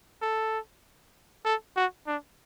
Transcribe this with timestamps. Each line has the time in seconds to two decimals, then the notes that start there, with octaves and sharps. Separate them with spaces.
0.22 A4
1.45 A4
1.76 F#4
2.07 D4